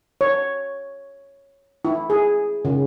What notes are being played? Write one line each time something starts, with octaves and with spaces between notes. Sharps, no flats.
C#5
E4
G#4
C#3